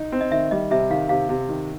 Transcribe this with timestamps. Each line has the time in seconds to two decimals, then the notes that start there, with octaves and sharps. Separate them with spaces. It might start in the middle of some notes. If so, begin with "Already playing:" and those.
Already playing: D#4
0.12 C4
0.21 D#5
0.32 D#3 E5
0.51 G3 D#5
0.71 C3 E5
0.90 D#3 F5
1.09 C3 F5
1.29 C3
1.49 D#3